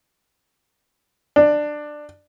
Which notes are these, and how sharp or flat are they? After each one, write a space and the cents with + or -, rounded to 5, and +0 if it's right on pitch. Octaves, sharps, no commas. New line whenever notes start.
D4 +15